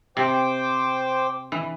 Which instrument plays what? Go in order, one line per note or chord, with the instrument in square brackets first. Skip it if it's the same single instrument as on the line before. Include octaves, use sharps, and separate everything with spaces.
[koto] C3 [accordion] C5 G5 D6
[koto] E3